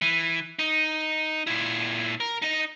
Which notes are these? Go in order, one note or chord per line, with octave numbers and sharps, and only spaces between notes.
E3
D#4
A#2 E4
A#4
D#4 D#5